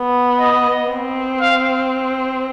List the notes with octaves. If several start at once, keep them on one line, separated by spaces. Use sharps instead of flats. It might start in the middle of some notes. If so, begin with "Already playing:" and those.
Already playing: B3
D#5
C4
F5